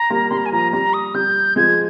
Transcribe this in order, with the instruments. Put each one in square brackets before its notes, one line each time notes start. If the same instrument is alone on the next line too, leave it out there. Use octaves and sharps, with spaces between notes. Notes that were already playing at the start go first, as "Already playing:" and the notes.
Already playing: [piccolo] A#5
[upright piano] G3 A#3
[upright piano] G3 [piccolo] C6
[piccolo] A#5
G#5
[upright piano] F3 [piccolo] A#5
[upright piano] G3 [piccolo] A#5
[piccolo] D#6
[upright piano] G3 [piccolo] G6
[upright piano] F3 G#3 [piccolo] G#6